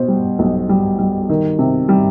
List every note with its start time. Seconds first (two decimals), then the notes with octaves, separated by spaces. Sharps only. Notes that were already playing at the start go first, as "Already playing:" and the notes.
Already playing: B2 C5
0.08 G3
0.39 B1
0.69 G3
0.99 G3
1.29 D#3
1.59 C3
1.89 G3